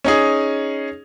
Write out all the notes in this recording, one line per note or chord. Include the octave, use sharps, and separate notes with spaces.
C#4 D#4 G#4